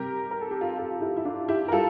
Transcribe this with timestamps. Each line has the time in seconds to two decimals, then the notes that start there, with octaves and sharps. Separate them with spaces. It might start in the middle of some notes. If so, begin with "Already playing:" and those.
Already playing: C3 G3 G4 A#4
0.31 A#4
0.41 A4
0.51 G4
0.61 F4 A4
0.77 F4 A4
0.91 F4
1.01 E4 G4
1.17 E4
1.25 D4 F4
1.48 E4 G4
1.68 A#4
1.72 G3 F4 A4